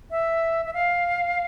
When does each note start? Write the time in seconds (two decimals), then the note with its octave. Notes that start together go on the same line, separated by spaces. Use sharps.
0.11 E5
0.65 E5
0.74 F5